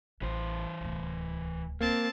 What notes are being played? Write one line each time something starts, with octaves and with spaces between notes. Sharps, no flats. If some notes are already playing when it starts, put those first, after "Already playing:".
A1 E3 C5
D1 C2
A#3 C4 A5